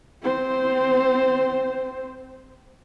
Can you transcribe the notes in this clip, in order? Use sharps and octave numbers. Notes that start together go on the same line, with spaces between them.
C4 C5